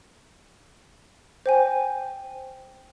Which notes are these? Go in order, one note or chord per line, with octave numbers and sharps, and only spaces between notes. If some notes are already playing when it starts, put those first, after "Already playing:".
C5 G5 G#5